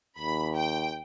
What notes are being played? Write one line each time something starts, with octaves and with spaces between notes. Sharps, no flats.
D#2 B5
G5